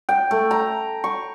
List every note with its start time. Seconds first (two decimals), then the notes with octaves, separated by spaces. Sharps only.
0.09 G5
0.31 A3
0.51 A#5
1.04 C#6